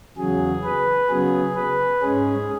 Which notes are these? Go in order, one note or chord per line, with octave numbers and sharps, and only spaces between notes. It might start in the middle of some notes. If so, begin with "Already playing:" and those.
E2 C#3 F#3 G#4
B4
C#3 F#3 B3 G#4
B4
G#2 G#3 C#4 G#4